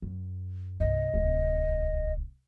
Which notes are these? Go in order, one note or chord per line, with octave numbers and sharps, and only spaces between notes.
F#2
C2 G2 D#5
D1 C2